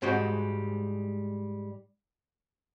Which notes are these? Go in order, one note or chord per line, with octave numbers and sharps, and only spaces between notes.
G#2 G3 G#3 F#4 C5